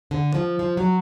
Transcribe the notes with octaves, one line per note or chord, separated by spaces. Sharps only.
D3
F3
F3
F#3